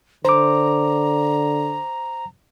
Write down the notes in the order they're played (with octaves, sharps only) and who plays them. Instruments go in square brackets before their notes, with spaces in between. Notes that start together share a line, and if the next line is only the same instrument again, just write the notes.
[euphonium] D3 [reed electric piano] C5 D6 [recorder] A#5